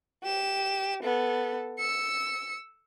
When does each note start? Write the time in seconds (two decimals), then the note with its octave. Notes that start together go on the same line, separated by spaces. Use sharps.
0.23 G4 E7
1.03 B3 A4
1.79 E6 C#7